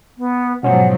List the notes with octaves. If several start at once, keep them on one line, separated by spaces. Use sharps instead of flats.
B3
G#2 B2 F3 F#3 C#4 C5 F#5